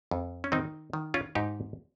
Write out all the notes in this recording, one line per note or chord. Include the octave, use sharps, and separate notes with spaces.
F2
C#4
D#3 C4 D#4
D#3
C#4 F4
G#2 D#4 G4